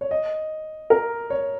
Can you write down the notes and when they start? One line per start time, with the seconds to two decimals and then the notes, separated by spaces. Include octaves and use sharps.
0.01 C#5
0.11 D#5
0.90 A#4
1.30 C#5